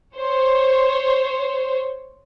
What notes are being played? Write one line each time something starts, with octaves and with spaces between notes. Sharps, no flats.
C5 C#5